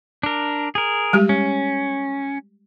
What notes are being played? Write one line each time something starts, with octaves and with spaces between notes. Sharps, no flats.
D4 A#4
G#4 A#4
G3 G#3 G4
C#4